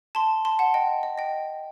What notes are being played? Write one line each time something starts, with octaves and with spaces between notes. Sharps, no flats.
A5 C6
A5 C6
F#5 A5
D#5 G5
D#5
D#5 G5